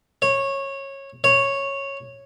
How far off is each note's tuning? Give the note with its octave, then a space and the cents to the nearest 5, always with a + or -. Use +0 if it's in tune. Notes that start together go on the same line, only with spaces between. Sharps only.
C#5 -15
C#5 -5